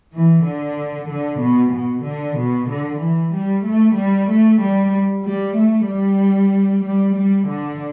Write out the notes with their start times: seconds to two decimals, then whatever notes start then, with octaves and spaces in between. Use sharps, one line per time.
0.13 E3
0.46 D3
1.10 D3
1.41 B2
1.73 B2
2.04 D3
2.37 B2
2.69 D3
3.00 E3
3.33 G3
3.65 A3
3.96 G3
4.29 A3
4.60 G3
5.24 G3
5.56 A3
5.88 G3
6.84 G3
7.16 G3
7.47 D3